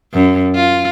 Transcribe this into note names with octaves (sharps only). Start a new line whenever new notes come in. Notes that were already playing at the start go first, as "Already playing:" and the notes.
F#2
F4